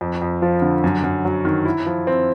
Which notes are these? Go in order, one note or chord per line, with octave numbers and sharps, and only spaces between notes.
F2
F2
F3
D3
F#2
F#2
F#3
D#3
E4
F3
C4